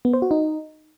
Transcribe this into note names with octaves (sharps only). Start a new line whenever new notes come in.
B3
C5
F#4
D#4